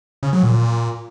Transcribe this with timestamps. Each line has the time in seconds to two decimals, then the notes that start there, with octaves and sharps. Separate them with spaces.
0.23 C#3
0.33 F#3
0.43 A#2